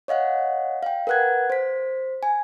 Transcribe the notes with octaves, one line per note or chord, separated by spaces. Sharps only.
C#5 D#5 F5 F#5
F5 G5
A#4 B4 F#5 F#6 G#6
C5 B6
G#5